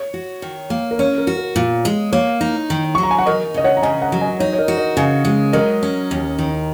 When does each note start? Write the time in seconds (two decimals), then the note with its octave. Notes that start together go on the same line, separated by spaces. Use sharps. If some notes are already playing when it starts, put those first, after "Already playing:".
Already playing: C#5
0.14 F#4
0.42 D#3
0.70 A#3
0.91 A#4
0.99 C#4 C#5
1.18 A#4
1.27 F#4
1.37 A#4
1.56 A#2
1.85 G#3
2.13 A#3 C#5
2.41 D#4
2.70 D#3
2.95 C#6
2.98 F#3
3.03 A#5
3.11 G#5
3.19 F#5
3.26 D#4 A#4 D#5
3.54 C#3 D#5
3.64 C#5 F#5
3.77 A#5
3.83 C#3 D#5 G#5
4.02 F#5 A#5
4.12 F#3
4.21 D#5 G#5
4.40 D#4 C#5
4.53 C#5
4.58 A#4 D#5
4.68 F#4
4.78 A#4 D#5
4.97 C#3 D#5 G#5
5.25 G#3
5.53 F#3 A#4 D#5
5.83 C#4
6.11 D#2
6.38 D#3